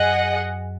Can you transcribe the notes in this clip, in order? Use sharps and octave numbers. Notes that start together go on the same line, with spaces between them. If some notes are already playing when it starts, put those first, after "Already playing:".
Already playing: F#2 F#3 G#4 D#5 F#5